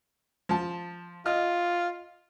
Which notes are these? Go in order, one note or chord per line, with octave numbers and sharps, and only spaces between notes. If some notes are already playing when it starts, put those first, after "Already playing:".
F3 A5
F4 D#5 F6